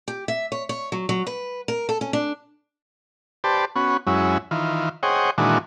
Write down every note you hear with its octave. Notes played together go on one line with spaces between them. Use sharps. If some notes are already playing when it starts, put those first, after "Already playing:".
G4
E5
C#5
C#5
F#3
F#3
B4
A#4
A4
C#4
D4
G4 B4 C5 D5 A5
B3 C#4 F#4
F#2 F#3 G#3 C#4 E4
D#3 E3 F4
G#4 C5 C#5 D#5 F#5 G5
A#2 D#3 E3 G#3 D4 F#4